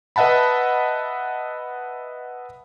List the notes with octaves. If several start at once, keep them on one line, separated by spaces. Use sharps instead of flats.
B4 D#5 E5 F#5 A5 B5